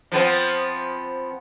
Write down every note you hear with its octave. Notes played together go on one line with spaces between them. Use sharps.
F3 B3 C4